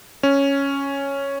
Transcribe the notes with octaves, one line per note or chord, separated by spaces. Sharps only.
C#4